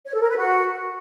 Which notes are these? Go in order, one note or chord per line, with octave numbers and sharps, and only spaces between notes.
C#5
A4
A#4
B4
F#4